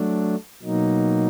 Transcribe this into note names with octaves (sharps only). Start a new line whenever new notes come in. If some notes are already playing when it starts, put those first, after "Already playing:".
Already playing: F#3 A3 D4
B2 F#3 A#3 D#4